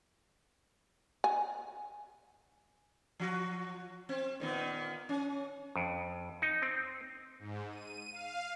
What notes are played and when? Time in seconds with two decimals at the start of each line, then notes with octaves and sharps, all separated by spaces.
1.24 G#5
3.20 F3 F#4
4.09 C4
4.40 A#2 D#3 B3
5.09 C#4
5.76 F2
6.42 D#4
6.62 C4
7.39 G#2
7.70 D#7
8.12 F5